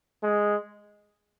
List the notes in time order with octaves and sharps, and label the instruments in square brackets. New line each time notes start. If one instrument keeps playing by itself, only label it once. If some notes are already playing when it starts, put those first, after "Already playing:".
[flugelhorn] G#3